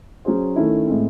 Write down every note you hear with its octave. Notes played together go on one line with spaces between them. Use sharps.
F#3 C#4 G#4 C5
D#3 A3 C#4 E4
A2 G#3 C4